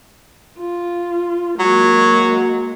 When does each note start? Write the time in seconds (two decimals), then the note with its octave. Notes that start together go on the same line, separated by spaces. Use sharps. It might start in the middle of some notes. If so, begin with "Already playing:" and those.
0.59 F4
1.59 F#3 G#3 A#3